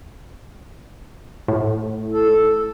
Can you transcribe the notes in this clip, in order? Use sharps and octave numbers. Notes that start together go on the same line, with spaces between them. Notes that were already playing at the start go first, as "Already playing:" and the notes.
A2
A4